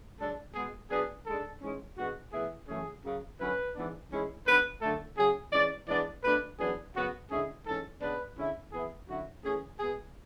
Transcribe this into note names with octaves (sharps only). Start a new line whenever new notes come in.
F#2 C#3 G#3 D4 A4
B2 G#3 B3 G#4
B2 F#3 B3 D4 G#4
G#2 G#3 D4 A4
G#2 E3 G#3 C#4
D3 G#3 B3 F#4
A2 E3 B3 E4 G#4
F#2 C#3 E3 A3 C#4 G#4
F#2 C#3 F#3
F#2 D3 F#3 C#4 E4 B4
G#2 E3 B3 D4
G#2 E3 G#3 C#4 E4
G#2 F#3 B3 D4 B4
F#2 D3 A3 A4
C#3 F#3 C#4 G#4
E3 G#3 C#4 D5
E3 G#3 B3 D4 D5
B2 A3 D4 B4
F#2 E3 B3 D4 G#4
F#2 C#3 F#3 B3 F#4
D3 G#3 C#4 E4 G#4
G#2 E3 G#3 C#4 A4
C#3 G#3 B3 D4 B4
D3 G#3 C#4 E4
E3 B3 E4 G#4
D3 F#3 C#4 E4 F#4
E3 A3 C#4 G#4
B2 G#3 B3 G#4